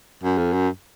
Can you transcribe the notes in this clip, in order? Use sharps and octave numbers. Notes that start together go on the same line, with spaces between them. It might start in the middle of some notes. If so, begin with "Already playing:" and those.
F#2
F2
F#2